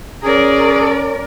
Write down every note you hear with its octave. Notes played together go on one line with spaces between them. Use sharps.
C#4 G#4 A#4 D5